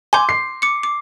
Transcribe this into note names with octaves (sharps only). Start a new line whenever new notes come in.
G#5 C6 D6 G6
C7
D6 C#7
D6